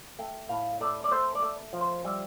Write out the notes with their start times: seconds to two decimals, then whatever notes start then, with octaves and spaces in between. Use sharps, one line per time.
0.18 A3 G5
0.49 A2 F5
0.81 A3 D5
1.04 D5
1.11 A3 C5
1.35 D5
1.42 A3
1.73 F3
1.81 C5
2.05 G3 E5